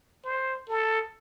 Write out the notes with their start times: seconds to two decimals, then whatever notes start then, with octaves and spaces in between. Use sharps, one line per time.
0.24 C5
0.69 A4